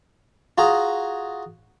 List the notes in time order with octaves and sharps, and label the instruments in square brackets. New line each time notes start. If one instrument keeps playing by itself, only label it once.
[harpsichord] F4 F#4 G#4 A#5